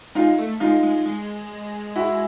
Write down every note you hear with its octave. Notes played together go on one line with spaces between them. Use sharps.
G#3 D#4 F4
A3
G#3 D#4 F4
G#3
G#3
E4 F#4